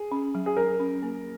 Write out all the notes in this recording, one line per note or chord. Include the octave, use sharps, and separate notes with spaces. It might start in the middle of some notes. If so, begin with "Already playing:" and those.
Already playing: G#4
C#4
F#3
G#4
G#4 A#4
C#4
A#3